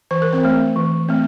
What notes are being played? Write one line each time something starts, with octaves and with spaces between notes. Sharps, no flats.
E3 C5
A#4
C4 C5
A3 C4
E3
A3 C4